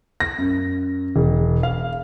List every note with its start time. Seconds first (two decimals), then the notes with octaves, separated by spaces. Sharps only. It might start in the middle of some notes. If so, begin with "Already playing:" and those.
0.20 A#6
0.38 F#2
1.16 E1
1.63 F5